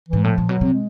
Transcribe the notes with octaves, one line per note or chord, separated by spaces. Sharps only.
G#2 E3
A2 F3
A#2
B2 F#3
C3
G#3